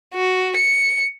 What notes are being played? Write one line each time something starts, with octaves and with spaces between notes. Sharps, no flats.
F#4
C#7